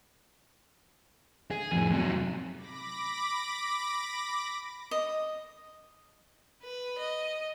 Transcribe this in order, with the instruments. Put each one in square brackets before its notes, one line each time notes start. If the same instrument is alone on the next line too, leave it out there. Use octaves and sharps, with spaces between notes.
[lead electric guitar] G#4
F2 A2
C3 F#3
[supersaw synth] B5 D6 A#6
[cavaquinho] D#5
[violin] B4
D#5